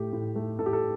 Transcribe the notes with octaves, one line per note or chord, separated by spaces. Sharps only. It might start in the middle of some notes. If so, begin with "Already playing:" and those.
Already playing: A2 A3 G4
A2
A3
A2 A4
G4
A4